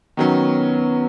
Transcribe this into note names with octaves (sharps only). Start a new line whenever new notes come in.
D#3 F#3 B3 C#4